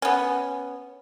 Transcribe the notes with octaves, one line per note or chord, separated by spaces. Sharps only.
B3 C#4